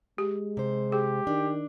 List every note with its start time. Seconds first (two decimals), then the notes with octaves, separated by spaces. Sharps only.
0.18 G#3 G4
0.57 C3 C5
0.92 G4 G#4
1.27 D#3 D4